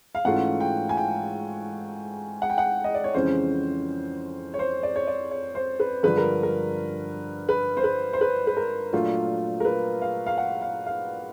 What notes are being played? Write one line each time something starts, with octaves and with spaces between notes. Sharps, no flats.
F5
G#2 E3 A3 C#4 F4 F#5
G5
G#5
G5
F#5
G5
F#5
D#5
D5
C#5
F2 C#3 E3 G#3 C#4 C5
C#5
C5
D5
C#5
D5
C#5
C5
B4
G2 D3 F3 G#3 B4
A#4
A#4
B4
C5
B4
C5
B4
B4
A#4
A#2 F#3 A3 D4 F4
A#4
B4
F5
F5
F#5
F5
F5